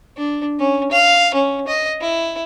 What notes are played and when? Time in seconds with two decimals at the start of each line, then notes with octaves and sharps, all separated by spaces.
0.17 D4
0.60 C#4
0.91 F5
1.34 C#4
1.68 D#5
2.01 E4